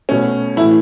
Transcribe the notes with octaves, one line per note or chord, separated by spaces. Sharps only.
B2 A3 C#4
A2 E3 A3 E4